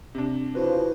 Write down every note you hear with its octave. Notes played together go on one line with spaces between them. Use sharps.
C3 D4
C#3 F3 E4 F#4 B4 C5